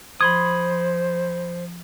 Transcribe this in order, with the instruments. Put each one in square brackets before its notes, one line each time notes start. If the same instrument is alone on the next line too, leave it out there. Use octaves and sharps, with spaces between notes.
[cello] F3 [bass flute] C5 [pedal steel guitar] B5 C6 D#6 [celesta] G#6